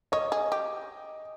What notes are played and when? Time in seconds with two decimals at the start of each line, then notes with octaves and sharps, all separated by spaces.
0.12 C#5 D#5
0.32 G#4
0.52 G4